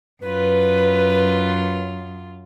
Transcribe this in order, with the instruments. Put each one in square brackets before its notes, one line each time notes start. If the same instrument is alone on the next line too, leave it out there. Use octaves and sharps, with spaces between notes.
[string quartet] F#2 F4 [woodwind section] B4